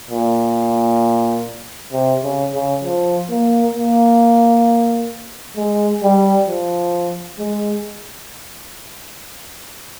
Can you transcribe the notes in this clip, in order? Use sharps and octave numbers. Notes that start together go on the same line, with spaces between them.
A#2
C3
C#3
C#3
F3
A#3
A#3
G#3
G3
F3
G#3